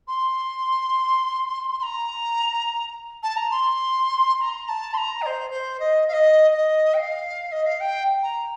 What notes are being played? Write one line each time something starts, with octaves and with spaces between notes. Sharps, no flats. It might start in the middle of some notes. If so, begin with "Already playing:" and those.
C6
C6
A#5
A5
A#5
C6
C6
A#5
A#5
A5
C6
A#5
D#5
C5
C5
D#5
F5
D#5
D#5
G5
F5
D#5
F5
G5
A#5